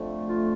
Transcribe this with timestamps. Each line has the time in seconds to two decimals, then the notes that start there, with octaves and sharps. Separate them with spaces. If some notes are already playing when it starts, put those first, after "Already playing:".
Already playing: F2 D3 A3
0.27 F4